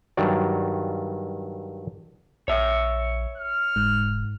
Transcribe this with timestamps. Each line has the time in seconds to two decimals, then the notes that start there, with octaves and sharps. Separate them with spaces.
0.17 G2 D#3 F#3 D5
2.48 A#1 C#5 E5
3.38 F6
3.76 F1 G#2